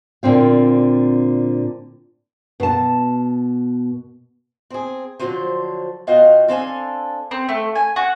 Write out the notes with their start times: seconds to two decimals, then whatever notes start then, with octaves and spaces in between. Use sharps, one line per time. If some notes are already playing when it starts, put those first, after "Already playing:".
0.23 A#2 D3 C4 F5
2.60 B2 A5
4.70 C4 G#4
5.19 D3 F3 F#3 C5
6.07 B2 F4 F#4 D#5 F5 G5
6.48 C4 D4 A4 F5 F#5 G#5
7.31 C4
7.49 A3
7.75 G#5
7.96 F#4